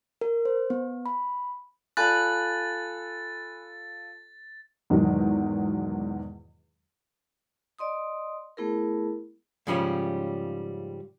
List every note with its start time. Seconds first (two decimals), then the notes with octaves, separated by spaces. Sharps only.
0.21 A#4
0.45 C5
0.70 B3
1.06 B5
1.97 F4 A4 D5 G#5 B5 F#6 A6
4.90 E2 G#2 B2 D#3 F#3
7.79 D5 D#5 C6 D#6
8.57 A3 B3 E4 G#4 A#4
9.67 G#2 C#3 F3 G3 C4 C#4